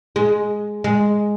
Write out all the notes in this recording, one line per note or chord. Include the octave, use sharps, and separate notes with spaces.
G#3
G#3